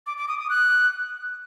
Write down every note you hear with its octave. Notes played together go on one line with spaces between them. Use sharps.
D6
D6
D#6
D#6
F#6